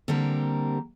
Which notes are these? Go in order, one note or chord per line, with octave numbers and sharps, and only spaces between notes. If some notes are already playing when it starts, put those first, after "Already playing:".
D3 G3 A#3 C4 G4 A#4